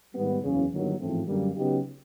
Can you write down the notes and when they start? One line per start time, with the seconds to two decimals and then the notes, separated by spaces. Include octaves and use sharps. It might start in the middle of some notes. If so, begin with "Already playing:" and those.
0.14 G#2 D#3 G3 B3
0.42 F#1 E2 C#3
0.71 G1 G2 D#3 F#3 A#3
1.00 A1 G#2 F3 A3 C4
1.27 F#2 D3 G3 A#3
1.56 C#3 F#3 B3 D#4 G4